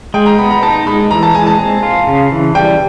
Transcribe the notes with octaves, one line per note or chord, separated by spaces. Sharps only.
G#3 G5
A#5
B3 B5
A#5
D#4 A5
G#3 B5
E3 A#5
A5
G#3 G#5
A5
C4
F4
C#3
E3
G3 G5